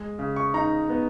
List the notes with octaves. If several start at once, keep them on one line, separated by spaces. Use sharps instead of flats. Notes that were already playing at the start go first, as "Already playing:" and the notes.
Already playing: G#3
C#3
C#6
D#4 A#5
B3